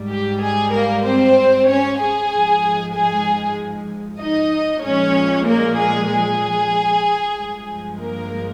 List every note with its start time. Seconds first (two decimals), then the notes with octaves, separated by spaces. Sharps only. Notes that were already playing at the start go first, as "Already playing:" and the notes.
Already playing: G#2 G3
0.10 G4
0.42 G#4
0.73 A#3 A#4
1.05 C4 C5
1.68 C#4 C#5
2.00 G#4 G#5
2.31 G#2 F3 G#3
2.94 G#4 G#5
4.20 D#4 D#5
4.83 A#2 F3 G#3 C#4 C#5
5.46 A#3 A#4
5.77 G#4
6.10 G#4
7.35 G2 F3 G#3
7.98 A#3 A#4